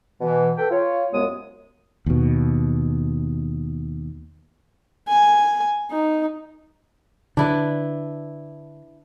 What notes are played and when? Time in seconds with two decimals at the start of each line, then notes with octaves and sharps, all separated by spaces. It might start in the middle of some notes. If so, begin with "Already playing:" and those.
0.21 B2 E3
0.58 A4 B4 G5
0.71 F4 C#5
1.12 C2 F#2 G#3 B3 C#5 D#6
2.06 D#2 B2
5.08 G#5
5.91 D#4
7.37 D3 D4 E4 B4